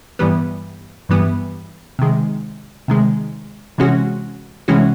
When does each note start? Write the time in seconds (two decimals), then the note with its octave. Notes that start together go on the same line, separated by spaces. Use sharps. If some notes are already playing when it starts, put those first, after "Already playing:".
0.19 G2 E3 G3 B3
1.09 G2 E3 G3 B3
1.99 C3 D#3 G#3
2.88 C3 D#3 G#3
3.78 C3 E3 G#3 C#4 F#4
4.68 C3 E3 G#3 C#4 F#4